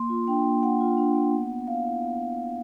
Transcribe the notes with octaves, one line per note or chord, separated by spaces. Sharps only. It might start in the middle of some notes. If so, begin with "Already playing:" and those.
Already playing: A#3 C6
F4
D4 G5
A#3
A#3 F#5
F4
D4
A#3
B3
B3
E4 F5
E4
B3
B3
E4